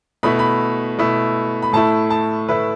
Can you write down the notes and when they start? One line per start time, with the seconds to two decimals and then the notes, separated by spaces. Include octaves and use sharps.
0.23 B2 A3 E4 B5
0.39 B5
0.98 B2 A3 E4
1.62 B5
1.73 A2 A3 E4 A5
2.10 A5
2.49 A2 A3 E4 B4